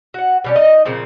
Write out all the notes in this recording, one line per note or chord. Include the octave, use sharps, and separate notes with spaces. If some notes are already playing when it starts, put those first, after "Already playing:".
F#4 F#5
B2 G3 C#4
D#4 D#5
A#2 C#3 F3 C4